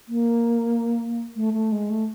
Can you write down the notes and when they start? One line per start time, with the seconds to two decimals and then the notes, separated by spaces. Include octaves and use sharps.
0.09 A#3
1.36 A3
1.53 A3
1.72 G#3
1.90 A3